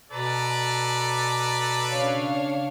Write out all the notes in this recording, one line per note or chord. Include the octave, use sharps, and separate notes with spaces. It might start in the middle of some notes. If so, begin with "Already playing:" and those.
B2 A4 B4 D5 A#5 A6
C#3 D4 C#5 F5